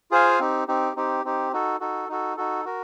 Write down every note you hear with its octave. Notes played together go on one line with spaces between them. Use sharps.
F4 G#4 C5 F5 G#5
C4 D#4 G4
C4 D#4 G4
C4 D#4 G4
C4 D#4 G4
D#4 F#4 A4
D#4 F#4 A4
D#4 F#4 A4
D#4 F#4 A4
F#4 A#4